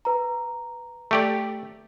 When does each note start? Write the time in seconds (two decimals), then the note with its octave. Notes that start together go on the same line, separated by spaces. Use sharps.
0.05 B4 A#5
1.11 A3 G4 D5